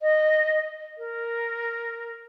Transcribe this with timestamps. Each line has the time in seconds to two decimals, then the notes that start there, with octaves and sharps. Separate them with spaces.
0.01 D#5
0.98 A#4